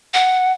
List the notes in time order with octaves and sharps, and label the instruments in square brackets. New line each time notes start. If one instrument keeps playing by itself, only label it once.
[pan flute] F#5